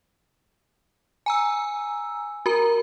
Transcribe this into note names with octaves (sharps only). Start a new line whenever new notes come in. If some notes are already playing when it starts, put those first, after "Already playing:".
G#5 A#5 E6
F#4 A#4 A#5